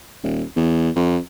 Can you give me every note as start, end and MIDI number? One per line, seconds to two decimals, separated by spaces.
0.23 0.43 27
0.56 0.90 40
0.96 1.18 41